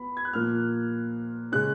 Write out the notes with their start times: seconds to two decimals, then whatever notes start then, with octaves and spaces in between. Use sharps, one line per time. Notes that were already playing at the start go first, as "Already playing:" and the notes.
Already playing: B3 B5
0.17 G#6
0.25 F#6
0.33 A#2 F3 A#3 F6
1.52 C#3 G#3 C#4 F#6